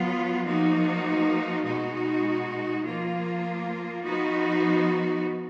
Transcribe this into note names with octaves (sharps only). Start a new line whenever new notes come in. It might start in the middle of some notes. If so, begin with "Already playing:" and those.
Already playing: F#3 B3 F4
F3 A#3 D#4 F#4
B2 G#3 D#4 F#4
F3 A#3 F4
F3 B3 D#4 F#4